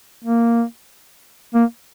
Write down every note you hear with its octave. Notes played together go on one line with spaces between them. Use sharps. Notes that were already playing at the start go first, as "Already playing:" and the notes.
A#3
A#3